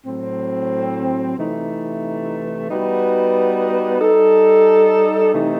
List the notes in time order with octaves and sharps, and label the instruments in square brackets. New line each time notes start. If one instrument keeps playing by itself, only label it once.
[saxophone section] A2 F#3 C4
C3 E3 A3 D#4
G3 B3 D#4 F#4 B4
G3 D#4 A4
C3 E3 A3 D#4